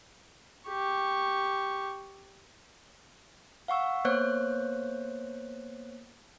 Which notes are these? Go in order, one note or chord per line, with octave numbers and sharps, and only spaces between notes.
G4 C#6
F5 F#5 C#6 E6
A#3 B3 C5 C#5 F#6